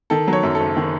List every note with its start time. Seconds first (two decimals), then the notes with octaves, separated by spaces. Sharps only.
0.10 D#3 A4
0.28 F#3
0.33 C#5
0.43 F#2
0.55 A4
0.60 F#1
0.77 D#3